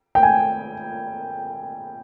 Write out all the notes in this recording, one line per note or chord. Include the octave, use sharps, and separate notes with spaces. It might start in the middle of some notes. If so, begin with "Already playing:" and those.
G5
G#5